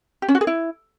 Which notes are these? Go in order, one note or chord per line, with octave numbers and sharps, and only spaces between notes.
G4
C#4
F#4
G#4
E4